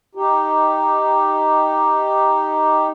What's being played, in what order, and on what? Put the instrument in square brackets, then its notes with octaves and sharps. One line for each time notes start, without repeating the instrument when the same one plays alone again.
[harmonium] D#4 G4